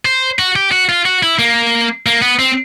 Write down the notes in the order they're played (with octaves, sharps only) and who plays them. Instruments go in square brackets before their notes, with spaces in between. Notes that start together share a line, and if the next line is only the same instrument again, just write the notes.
[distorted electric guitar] C5
F#4
G4
F#4
F4
F#4
E4
A#3
A#3
B3
C4